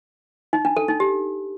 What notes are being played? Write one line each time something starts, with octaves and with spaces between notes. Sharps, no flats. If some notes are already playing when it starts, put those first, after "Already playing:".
D#4
D4
A4
D#4
G4